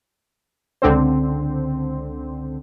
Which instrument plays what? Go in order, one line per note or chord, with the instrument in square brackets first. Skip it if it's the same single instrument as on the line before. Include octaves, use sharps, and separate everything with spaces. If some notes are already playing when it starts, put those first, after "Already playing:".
[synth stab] C#2 D3 C4 C5